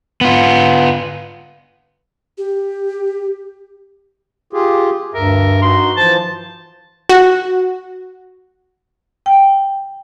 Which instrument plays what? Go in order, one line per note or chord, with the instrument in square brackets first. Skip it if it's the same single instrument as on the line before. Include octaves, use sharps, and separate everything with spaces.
[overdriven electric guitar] B3 F4
[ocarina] G4
[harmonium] F4 G4 G#4
[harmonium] D2 E5 [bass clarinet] G2 [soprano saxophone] A#4
[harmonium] D#4 F#4 [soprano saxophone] C6
[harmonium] E3 F3 C5 [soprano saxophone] A5
[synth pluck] F#4
[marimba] G5